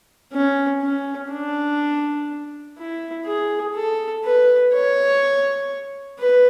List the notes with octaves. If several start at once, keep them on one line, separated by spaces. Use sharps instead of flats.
C#4
C#4
D4
E4
G#4
A4
B4
C#5
B4